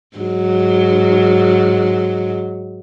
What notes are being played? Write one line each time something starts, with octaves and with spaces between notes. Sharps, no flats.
G#2 F#3